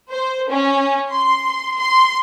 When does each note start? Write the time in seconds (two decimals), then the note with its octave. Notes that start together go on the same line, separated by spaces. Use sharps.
0.11 C5
0.49 C#4
1.11 C6
1.78 C6